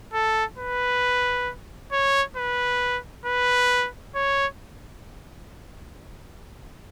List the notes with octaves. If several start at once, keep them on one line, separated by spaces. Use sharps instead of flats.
A4
B4
C#5
B4
B4
C#5